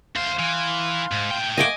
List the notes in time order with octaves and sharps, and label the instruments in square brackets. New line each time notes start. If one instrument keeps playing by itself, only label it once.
[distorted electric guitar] D2 C5 [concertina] F5 C6
[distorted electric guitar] E3
G#2
A2 G5
[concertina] A3 A#3 F#5 [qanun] D#5 G#5 D6